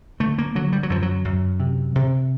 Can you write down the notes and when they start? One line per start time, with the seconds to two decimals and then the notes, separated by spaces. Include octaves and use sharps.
0.20 D3 A3
0.38 A#3
0.55 D3 F#3
0.72 G3
0.83 F#3
0.90 F#2 F3
1.02 F#3
1.25 F#2
1.60 C3
1.95 C3